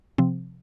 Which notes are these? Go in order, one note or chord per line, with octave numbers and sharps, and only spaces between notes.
C3 F3 C4